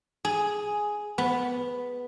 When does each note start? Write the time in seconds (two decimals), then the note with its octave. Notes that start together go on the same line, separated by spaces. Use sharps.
0.25 G#4
1.18 B3